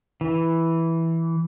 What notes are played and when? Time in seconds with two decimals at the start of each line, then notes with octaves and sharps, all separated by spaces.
0.21 E3